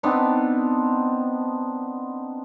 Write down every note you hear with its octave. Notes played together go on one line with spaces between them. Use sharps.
B3 C4 D4 D#4